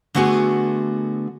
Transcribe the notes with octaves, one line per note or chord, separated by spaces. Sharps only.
D3 A3 B3 F#4 G#4